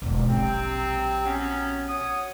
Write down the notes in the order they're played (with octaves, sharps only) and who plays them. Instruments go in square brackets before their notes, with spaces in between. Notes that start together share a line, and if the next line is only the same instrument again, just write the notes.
[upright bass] E1 G#2
[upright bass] A#1 [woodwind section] C3 F#3 C4
[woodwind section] F#3 B3 C#4
F#4 C#5 D#6